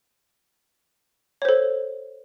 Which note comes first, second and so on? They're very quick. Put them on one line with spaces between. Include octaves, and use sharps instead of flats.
C#5 C5 A4